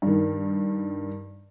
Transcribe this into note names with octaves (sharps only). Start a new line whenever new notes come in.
G2 D#3